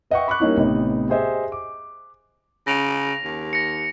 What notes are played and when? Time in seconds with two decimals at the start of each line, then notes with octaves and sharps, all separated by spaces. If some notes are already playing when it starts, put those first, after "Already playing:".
0.10 B4 D#5 E5 F#5 G5 C#6
0.28 B5 C#6 D6 F#6
0.40 G3 A#3 C#4 D#4 E4
0.57 A1 C3 B3 D#4
1.09 G4 G#4 C5 D#5 E5 G#5
1.52 D6
2.67 C#3 A#6 F7
3.24 D#2
3.53 A#6 C#7